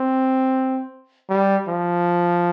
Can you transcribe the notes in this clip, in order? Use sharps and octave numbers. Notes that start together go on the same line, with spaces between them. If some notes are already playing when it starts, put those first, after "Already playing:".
Already playing: C4
G3
F3